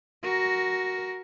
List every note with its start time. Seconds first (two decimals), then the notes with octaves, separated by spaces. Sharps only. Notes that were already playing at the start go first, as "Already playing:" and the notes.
0.23 F#4 A#4